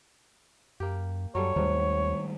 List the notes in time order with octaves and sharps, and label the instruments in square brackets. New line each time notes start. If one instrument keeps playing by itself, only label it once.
[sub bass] F#2 [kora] A#3 G4
[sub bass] F#2 [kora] F#3 G3 A4 [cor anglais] C#5
[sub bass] D#2 [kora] G#2 F#3 [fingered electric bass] D#3 G3 A3